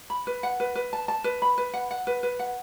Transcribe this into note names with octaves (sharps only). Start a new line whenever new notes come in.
B5
B4
F#5
B4
B4
A5
A5
B4
B5
B4
F#5
F#5
B4
B4
F#5